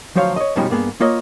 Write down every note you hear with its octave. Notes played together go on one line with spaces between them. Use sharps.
D2 F3 F#3 C5 C#5 F5
C#5 D#5
F#2 B2 F3 G3 C#4 D#4
G2 A#3 B3 G#4
A#3 F4 C#5 D#5